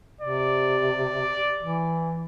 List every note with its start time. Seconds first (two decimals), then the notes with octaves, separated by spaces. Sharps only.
0.21 C3 D5
1.61 E3